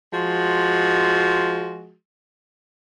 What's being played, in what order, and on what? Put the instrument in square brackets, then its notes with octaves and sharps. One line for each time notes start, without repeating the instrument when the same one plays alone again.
[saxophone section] F3 G#3 F#4